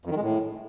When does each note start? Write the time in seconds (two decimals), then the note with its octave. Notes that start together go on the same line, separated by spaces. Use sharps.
0.05 F2
0.11 D#3
0.16 G#3
0.22 A2